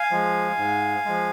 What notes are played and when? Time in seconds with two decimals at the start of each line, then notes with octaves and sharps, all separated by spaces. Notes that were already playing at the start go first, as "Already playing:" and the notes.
Already playing: F5 G#5
0.11 F3 G#3
0.57 G#2
1.05 F3 G#3